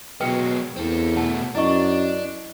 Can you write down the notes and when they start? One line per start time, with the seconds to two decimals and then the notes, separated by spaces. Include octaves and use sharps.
0.21 B2 F#3 G#3 A#4 B4 G5
0.76 E2 C4 A4
1.16 B2 A3 F#5 A5
1.55 F#2 D4 E4 D#5 C#6